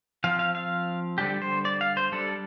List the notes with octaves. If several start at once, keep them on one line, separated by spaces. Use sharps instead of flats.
F3 C4 F5
F5
F5
D3 G3 D4 G4
C5
D5
F5
C5
G3 D4 A4